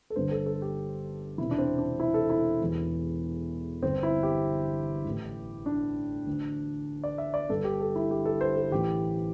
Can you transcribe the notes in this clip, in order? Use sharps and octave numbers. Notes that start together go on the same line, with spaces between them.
A4
G1 G2 D3 C5
A4
A4
G4
E1 E2 C3 E3 E4
D4
C4
D4
E4
A4
E4
E1 E2 E3
G1 G2 D3 C4
E4
G4
A1 A2 E3
D4
D2 D3
D5
E5
D5
G1 G2 D3 A4
G4
A4
E4
G4
A4
C5
A4
A1 A2 E3 G4